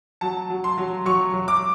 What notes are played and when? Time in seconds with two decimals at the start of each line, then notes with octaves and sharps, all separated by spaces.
0.21 F#3 A5
0.50 F#3
0.64 C6
0.78 F#3
1.05 F#3 C#6
1.33 F#3
1.48 D6